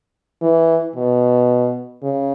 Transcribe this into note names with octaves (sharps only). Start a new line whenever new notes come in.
E3
B2
C#3